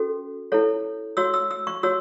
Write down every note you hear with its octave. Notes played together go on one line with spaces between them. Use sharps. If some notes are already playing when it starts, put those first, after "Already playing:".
Already playing: C#4 F#4 A4
E4 A4 C#5
F#4 C#5 E6
E6
E6
C#6
F#4 C#5 E6